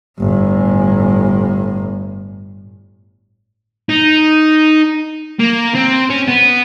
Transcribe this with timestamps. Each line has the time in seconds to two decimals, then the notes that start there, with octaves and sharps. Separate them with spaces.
0.19 G1 A2
3.89 D#4
5.39 A#3
5.74 C4
6.10 C#4
6.28 B3